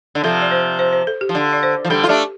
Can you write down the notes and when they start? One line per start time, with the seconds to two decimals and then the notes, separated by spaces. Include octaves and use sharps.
0.15 D3
0.24 C3 F3 A4
0.42 D5
0.51 C5
0.79 C5
0.93 C5
1.07 A4
1.21 G4
1.29 F3
1.35 D3
1.53 D5
1.63 C5
1.85 F3
1.90 D3 G3 A4
2.03 F4 A4
2.09 A3 D4 G4